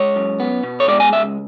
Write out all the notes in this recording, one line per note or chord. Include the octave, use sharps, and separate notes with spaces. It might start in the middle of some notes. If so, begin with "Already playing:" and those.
Already playing: G#3 C#5
F#2
B3
B2
C#5
G#3 D5
G#5
C#2 E5